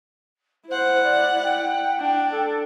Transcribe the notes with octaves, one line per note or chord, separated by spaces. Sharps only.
E4 C5 F#5
D5
G5
D4
A4